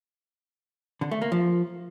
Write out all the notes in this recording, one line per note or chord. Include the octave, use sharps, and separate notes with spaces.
D3
A3
A#3
F3